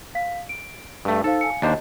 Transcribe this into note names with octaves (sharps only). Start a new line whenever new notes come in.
F5 B6
D7
G2 A3
D#4 A4 C5 F5
F5 G#5 C#7
D#2 D4 C5 D#5